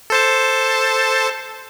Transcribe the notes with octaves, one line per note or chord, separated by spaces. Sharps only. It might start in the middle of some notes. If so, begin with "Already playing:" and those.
A4 C5 A5